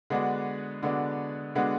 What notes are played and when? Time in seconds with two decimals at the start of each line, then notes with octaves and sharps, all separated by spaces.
0.10 D3 G#3 B3 D4 F#4
0.83 D3 G#3 B3 D4 F#4
1.55 D3 G#3 B3 D4 F#4